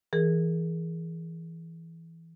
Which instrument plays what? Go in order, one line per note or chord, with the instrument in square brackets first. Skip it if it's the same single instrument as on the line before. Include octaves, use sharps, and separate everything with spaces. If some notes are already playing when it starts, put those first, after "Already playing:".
[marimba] E3 G#4 A#4